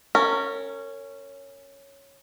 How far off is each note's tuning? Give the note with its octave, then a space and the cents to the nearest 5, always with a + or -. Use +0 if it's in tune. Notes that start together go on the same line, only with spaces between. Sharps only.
C#4 +0 A#4 -30